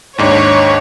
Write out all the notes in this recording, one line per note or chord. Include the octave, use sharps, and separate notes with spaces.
D#2 G#2 D4 C#5